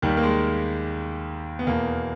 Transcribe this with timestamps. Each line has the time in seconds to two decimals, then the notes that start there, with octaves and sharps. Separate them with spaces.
0.02 D#2 D#3 G3
0.17 A#3
0.23 G#3
1.59 B3
1.67 E2 B2 A#3